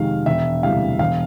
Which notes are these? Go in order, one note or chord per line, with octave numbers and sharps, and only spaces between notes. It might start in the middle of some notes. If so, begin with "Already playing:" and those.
Already playing: F2 C3 D#3 G#3 F5
E1 E5
D2 C3 E3 G3 F5
E1 F5